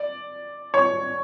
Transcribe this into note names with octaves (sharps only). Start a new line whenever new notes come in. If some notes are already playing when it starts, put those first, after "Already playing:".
Already playing: D5
C#5